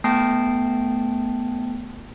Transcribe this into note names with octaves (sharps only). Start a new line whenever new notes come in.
A3 B3 G5 A5 C7